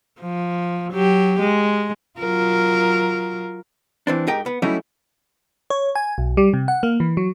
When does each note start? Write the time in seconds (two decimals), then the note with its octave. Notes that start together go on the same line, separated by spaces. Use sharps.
0.20 F3
0.92 F#3 G4
1.40 G#3
2.19 F#3 F4 A#4
4.07 E3 C4 D4
4.27 G#2 D#4 G4 A#4 G5
4.46 B3
4.62 F#3 G3 A3 C#4 D#4 E4
5.70 C#5
5.95 G#5
6.18 B1
6.37 G3
6.53 C3
6.68 F#5
6.83 A#3
7.00 E3
7.17 F#3